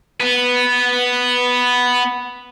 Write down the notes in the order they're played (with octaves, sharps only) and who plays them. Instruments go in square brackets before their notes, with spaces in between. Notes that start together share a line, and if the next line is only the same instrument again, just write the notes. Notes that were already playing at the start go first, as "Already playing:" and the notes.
[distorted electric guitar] B3 B4